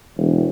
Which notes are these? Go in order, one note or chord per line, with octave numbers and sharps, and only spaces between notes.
E1